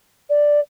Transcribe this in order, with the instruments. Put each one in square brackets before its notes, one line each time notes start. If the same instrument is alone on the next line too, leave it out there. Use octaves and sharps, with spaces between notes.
[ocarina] D5